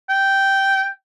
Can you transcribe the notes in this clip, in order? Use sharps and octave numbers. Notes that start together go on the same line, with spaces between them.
G5